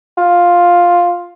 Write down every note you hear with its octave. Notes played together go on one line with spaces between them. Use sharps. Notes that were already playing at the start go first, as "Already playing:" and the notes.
F4